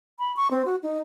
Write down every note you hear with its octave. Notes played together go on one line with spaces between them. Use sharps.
B5
C#6
C4
F#4
D#4